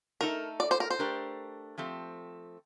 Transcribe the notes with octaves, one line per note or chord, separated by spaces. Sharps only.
A3 D#4 A4 A#4
D5
C5
A#4
C5
A3 D4 G4 A#4
F3 A3 C4 G4